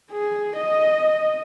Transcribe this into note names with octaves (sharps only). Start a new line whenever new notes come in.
G#4
D#5